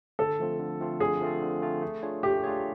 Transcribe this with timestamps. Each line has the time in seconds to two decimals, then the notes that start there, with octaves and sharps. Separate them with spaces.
0.19 D3 A4
0.39 F3 A3 C4 F4
0.59 D3
0.81 F3 A3 C4 F4
1.00 D3 G#4
1.21 F3 A3 C4 F4
1.42 D3
1.62 F3 A3 C4 F4
1.82 A3
2.03 D4 F4 G#4 C#5
2.23 A3 G4
2.44 D4 F4 G#4 C#5